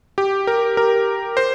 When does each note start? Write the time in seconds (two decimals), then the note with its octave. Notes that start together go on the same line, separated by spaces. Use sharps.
0.18 G4
0.47 A#4
0.77 A#4
1.37 C5